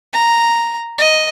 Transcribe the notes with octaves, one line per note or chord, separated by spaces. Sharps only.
A#5
D#5